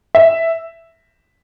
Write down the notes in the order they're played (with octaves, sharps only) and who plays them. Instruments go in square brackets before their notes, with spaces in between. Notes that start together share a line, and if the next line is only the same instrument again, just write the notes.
[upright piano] E5